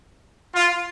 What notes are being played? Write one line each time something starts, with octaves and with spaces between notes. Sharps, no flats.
F4